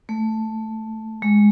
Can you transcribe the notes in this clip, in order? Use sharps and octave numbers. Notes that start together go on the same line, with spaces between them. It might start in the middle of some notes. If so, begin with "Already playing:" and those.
A3
G#3